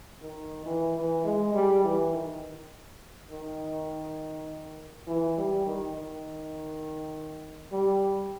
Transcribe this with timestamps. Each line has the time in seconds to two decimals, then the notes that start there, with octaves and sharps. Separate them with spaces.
0.22 D#3
0.66 E3
0.96 E3
1.25 G#3
1.54 G3
1.84 E3
2.13 D#3
3.31 D#3
5.07 E3
5.38 G3
5.67 D#3
5.96 D#3
7.72 G3